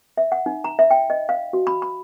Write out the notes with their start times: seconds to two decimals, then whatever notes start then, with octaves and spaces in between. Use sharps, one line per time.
0.18 E5
0.32 F#5
0.46 D#4
0.64 A#5
0.79 E5
0.91 G5
1.10 D#5
1.29 F5
1.53 F#4
1.67 B5
1.82 B5